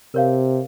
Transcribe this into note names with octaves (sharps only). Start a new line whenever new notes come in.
C3 A#4 C#5 F5